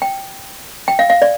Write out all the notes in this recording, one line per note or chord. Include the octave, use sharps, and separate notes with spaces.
G5
G5
F5
F5
D5